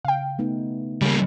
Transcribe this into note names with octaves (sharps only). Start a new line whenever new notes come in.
C#3 F5 G5
A3 B3 D#4
C#3 G3 A#3